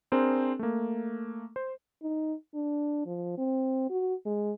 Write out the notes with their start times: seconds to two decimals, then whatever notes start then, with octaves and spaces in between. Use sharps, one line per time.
0.12 C4 D4 G#4 A#4 C5
0.59 A3 A#3
1.56 C5
2.02 D#4
2.54 D4
3.06 F3
3.37 C4
3.90 F#4
4.25 G#3